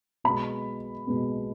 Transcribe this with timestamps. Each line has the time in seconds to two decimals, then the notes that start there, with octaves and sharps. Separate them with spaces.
0.24 B2 G#3 B3 B5
1.07 B2 G#3 B3